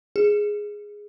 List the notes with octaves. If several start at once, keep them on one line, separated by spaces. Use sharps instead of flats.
G#4